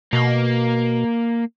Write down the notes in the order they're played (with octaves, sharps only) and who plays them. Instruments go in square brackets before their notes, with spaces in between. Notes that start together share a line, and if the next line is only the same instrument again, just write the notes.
[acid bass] B2 [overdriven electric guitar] A#3